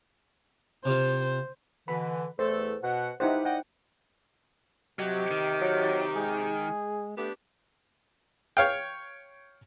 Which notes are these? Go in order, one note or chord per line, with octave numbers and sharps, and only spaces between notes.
C3 F4 C5
B2 D3 E3 B5
E2 A3 A4 C5
B2 F#5
D#4 E4 G4 B4 C5 F#5
D5 D#5 F#5 G5
C3 F#3 G4 D#5
D#3
F#3
G#3 G#4
A3 B3 D4 G4
C#5 F5 G5